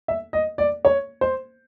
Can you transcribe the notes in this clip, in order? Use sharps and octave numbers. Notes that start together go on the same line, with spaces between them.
E5
D#5
D5
C#5
C5